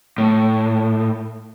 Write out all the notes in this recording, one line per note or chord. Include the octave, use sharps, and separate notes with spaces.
A2